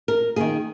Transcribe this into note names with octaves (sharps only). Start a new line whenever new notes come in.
A#4
D#3 A#3 G#4